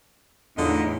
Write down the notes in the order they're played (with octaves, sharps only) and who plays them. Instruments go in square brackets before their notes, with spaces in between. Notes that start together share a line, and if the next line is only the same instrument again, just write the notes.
[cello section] E2 A2 [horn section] D3 F4 D#5 [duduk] D#4